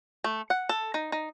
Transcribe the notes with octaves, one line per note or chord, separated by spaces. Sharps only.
A3
F#5
A4
D#4
D#4